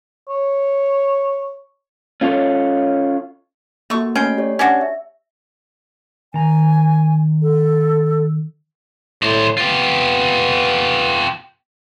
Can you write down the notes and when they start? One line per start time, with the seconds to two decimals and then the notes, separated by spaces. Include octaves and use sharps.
0.29 C#5
2.21 C#4 F4 A4 C#5
3.90 A3 A#3 F#4 C#6
4.15 A3 C#4 G5 C7
4.38 G4 C#5 D5
4.59 C#4 D4 F#4
4.81 E5
6.34 D#3 G#5 A#5
7.42 A4
9.23 A2 C5 D5
9.58 B3 F4 G4